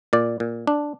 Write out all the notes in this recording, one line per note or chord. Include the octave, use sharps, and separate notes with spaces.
A#2 D5
A#2
D4